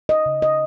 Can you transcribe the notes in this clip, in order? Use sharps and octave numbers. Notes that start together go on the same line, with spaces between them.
D#5
C#3
D#5